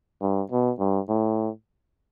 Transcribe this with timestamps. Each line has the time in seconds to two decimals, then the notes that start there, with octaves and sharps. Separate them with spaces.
0.21 G2
0.51 B2
0.79 G2
1.09 A2